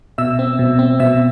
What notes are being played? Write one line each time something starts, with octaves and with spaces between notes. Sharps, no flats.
B2 E5 E6
C4
B2
C4
B2 E5 E6